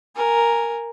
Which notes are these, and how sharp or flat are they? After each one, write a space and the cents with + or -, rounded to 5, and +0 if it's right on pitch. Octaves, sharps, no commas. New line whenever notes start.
A#4 +0 G#5 +0